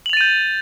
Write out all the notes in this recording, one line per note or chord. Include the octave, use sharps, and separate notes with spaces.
G6 A6 D#7 F7 F#7